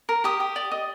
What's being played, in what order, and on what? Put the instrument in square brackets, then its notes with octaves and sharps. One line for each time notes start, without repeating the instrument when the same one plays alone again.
[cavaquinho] A#4
G4 D#6
G4
D5
D#5